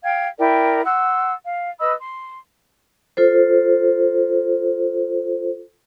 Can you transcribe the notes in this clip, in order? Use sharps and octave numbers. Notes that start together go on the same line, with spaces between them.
F5 G5 G#6
E4 A#4 D5 G5
F#5 C6 E6
F5
B4 D#5 B5 E6
C6
F4 A4 C5